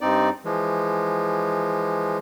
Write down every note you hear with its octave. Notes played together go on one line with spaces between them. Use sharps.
G2 C4 D#4 D5
E3 F3 G#3